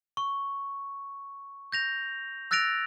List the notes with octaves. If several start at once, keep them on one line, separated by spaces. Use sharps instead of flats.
C#6
G6 A#6 F7
E6 F#6 A6 A#6 D7 F7